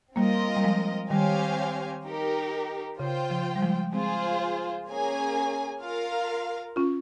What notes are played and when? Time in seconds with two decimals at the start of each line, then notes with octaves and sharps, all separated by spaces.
0.16 G3 A#3 C4 F4 A#4 D#5
0.56 G3
0.64 F3 G#3
1.10 D#3 G3 C4 G4 C#5 F5 G#5
2.05 D#4 G4 A#4
2.99 C#3 F4 C5 G5
3.30 C#3 F3
3.56 G3
3.62 F3 G#3
3.93 G#3 C4 F4 G#4 C5
4.88 A#3 C#4 G#4 C#5 G#5
5.82 F4 A#4 F5
6.76 C#4 F4